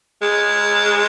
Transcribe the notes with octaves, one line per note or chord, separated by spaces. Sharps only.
G#3